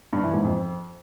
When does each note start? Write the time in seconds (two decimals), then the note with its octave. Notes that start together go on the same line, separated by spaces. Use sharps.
0.13 G2
0.23 E3
0.34 G#2
0.44 F2